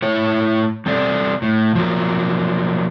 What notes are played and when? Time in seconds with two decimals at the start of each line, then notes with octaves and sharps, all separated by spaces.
0.02 A2 E4 C#5
0.86 G3 C4 A4 D5
1.42 A2
1.75 F3 F#3 A#3